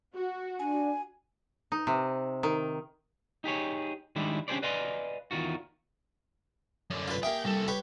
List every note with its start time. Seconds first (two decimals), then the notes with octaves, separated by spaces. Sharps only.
0.14 F#4
0.59 D4 G#5
1.72 D#4
1.87 C3
2.43 D#3
3.44 D#4 G4 G#4 C#5
4.16 D#3 G3 G#3 D4 E4
4.48 C#4 D4 G4 G#4 C5 D5
4.63 B4 D5 D#5 F5 G#5 C6
5.31 E2 D#3 F4 F#4
6.90 F#2 D3
7.08 F4 B4
7.23 A#3 G4 G#4 E5 G5
7.45 C2 G3 A4
7.68 G4 B4 C#5